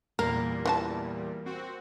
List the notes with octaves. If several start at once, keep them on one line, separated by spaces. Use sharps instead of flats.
E2 A#2 G3 A#3 A#4
E3 F4 A5
C4 F#4